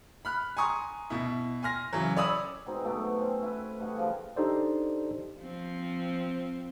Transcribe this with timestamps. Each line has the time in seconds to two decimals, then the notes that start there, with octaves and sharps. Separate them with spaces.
0.25 B5 F6 F#6
0.57 G#5 A#5 C6 C#6 D#6
1.10 B2 E4
1.63 G#5 C6 F6 A#6
1.93 C#3 E3 F#3
2.16 C#5 D5 B5 D#6 E6
2.66 B2 G#3 C4 D#4
2.84 F#3 A3 B3 D5
3.18 C4 C#4
3.42 E4 B4
3.79 G3 A3 D#5 F#5
3.96 C#3 F3 G4
4.36 D4 D#4 G4 A4 C5 D5
5.41 F3 C4